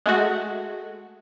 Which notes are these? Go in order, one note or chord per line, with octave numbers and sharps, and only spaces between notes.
G#3 A3 F#4